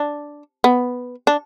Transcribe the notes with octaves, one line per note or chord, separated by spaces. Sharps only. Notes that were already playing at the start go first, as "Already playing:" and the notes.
Already playing: D4
B3
D4